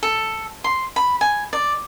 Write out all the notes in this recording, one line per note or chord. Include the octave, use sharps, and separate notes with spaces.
A4
C6
B5
G#5
D5